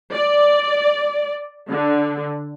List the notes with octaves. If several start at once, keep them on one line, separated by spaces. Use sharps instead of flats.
D5
D3